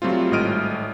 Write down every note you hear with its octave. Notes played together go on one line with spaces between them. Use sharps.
F#3 G3 A3 C4 F4
G#1 A2 D#5 F6 D7 D#7